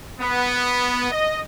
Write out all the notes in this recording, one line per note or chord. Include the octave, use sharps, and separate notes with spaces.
B3
D#5